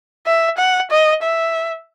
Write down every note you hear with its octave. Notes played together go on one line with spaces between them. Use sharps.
E5
F#5
D#5
E5